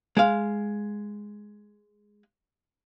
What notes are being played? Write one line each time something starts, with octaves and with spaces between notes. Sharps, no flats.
G#3 F5